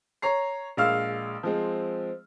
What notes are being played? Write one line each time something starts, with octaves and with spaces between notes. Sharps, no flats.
C#5 A#5 C7
A#1 G#3 F5 E6 F6
F3 G#3 C4